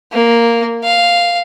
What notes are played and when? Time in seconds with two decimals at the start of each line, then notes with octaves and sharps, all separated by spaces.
0.12 A#3
0.84 F5